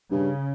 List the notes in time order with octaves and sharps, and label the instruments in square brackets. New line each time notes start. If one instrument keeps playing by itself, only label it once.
[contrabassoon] G2 [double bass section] C#3